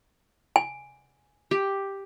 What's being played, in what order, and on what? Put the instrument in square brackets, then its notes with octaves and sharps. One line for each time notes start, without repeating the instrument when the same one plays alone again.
[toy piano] G#5
[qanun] G4